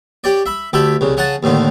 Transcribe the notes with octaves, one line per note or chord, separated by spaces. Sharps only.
G4 C#5 D5
E5 B5
D2 G4 A4 E5 B5
C2 C#3
C#3 C#5 F#5 G#5 A5
D#2 A2 D3 D#3